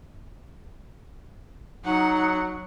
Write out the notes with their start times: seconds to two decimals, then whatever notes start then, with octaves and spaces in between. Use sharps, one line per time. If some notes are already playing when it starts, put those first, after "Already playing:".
1.85 F#3 D#4 F#5